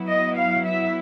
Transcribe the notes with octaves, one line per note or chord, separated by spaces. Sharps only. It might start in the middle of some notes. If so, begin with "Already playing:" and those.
Already playing: F#3 B3 E4
D#5
F5
E5